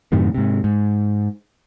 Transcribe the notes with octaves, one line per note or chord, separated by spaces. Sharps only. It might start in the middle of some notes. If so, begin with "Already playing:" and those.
F#2 A2 C3 D#3
G#2 C3
G#2